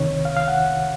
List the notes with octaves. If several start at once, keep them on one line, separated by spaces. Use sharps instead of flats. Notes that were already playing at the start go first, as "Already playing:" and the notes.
Already playing: C2 C3 D#3 C#5
F5
F5
F#5